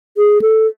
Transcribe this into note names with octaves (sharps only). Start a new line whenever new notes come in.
G#4
A4